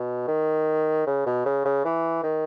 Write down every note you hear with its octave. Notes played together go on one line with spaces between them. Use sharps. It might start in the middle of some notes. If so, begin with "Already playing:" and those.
Already playing: B2
D#3
C#3
B2
C#3
C#3
E3
D#3